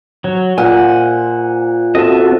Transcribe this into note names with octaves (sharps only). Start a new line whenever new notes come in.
F#3 C#5
A#2 C5 F#5 G#5
C4 F#4 A4 D#5 E5